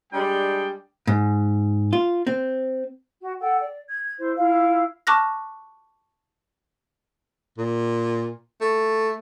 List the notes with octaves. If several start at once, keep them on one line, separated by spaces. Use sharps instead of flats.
G3 G#3 D4 G5
G#2
F4
C4
F#4
A4 F#5 G5
D5
G#6
E4 C5
E4 F4 F5
A5 C#6 D6 F6 F#6 A#6
A#2
A3